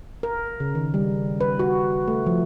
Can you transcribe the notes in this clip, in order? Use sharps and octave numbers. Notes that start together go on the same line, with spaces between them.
A#4
C#3
D#3
G3
B4
F#4
A3
F3